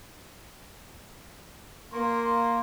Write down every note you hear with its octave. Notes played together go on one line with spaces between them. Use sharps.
A#3 C6